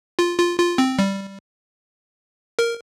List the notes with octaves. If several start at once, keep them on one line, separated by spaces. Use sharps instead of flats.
F4
F4
F4
C4
G3
A#4